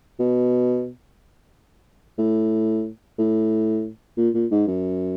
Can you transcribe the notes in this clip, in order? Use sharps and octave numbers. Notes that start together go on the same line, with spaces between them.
B2
A2
A2
A#2
A#2
G#2
F#2